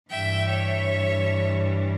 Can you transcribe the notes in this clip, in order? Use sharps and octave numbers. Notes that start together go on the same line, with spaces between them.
G2 E3 E5 G5
C#5 E5